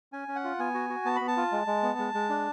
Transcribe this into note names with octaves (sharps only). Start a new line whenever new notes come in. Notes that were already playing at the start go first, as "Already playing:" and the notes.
C#4 G#5
C#4
F#5
F4
B3 G#5
F#4
F#4
B3 A5
B3 B5
A5
F4
G#3
G#3
B3
G#3
G#3
D4